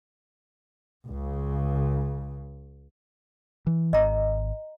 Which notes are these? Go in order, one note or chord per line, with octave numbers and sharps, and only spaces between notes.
C#2 C#3
E3
G#1 D#5 A#5